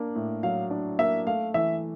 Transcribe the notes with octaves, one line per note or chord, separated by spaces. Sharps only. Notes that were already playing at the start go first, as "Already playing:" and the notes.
Already playing: A#3 D4
A2
F#3 F5
D4
A#3 E5
A3 F5
E3 E5